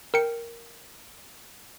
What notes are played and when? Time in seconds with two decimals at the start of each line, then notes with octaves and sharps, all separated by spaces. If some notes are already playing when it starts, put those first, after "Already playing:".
0.14 A#4 G5 C#7